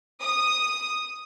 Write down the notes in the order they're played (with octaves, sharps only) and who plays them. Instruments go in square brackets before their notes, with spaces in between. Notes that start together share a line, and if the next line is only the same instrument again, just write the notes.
[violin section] D#6